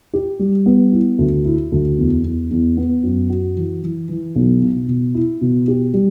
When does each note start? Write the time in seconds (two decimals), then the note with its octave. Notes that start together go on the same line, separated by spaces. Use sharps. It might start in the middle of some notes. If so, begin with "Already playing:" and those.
0.13 G4
0.39 G3
0.66 B3
0.92 E4
1.18 D2
1.45 E4
1.72 D2
1.98 E2
2.24 E2
2.51 E2
2.77 B3
3.03 F#2
3.30 F#4
3.56 E3
3.82 E3
4.09 E3
4.36 B1
4.61 B2
4.88 B2
5.15 E4
5.41 B2
5.68 G4
5.94 G3